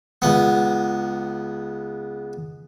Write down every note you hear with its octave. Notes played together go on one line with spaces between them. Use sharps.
C#2 B3